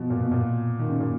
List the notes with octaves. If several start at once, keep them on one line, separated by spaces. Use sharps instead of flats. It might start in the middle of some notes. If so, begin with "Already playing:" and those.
Already playing: B2 F3
A#2
B2
A#2
D#3
C#3
A#2